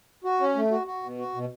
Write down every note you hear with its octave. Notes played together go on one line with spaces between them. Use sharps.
F#4
C#4
A3
F#4
F#4
B2
F#4
B2